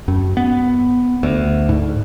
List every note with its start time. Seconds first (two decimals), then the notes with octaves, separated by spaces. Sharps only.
0.08 F#2
0.37 B3
1.23 D2
1.69 G#2